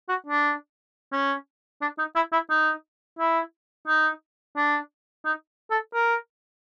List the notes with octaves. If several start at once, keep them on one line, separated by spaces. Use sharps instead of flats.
F#4
D4
C#4
D4
D#4
E4
E4
D#4
E4
D#4
D4
D#4
A4
A#4